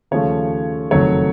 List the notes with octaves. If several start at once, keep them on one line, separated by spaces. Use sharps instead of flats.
D#2 C#3 F3 A3 C#5
F#1 F2 D#3 F#3 A3 C#5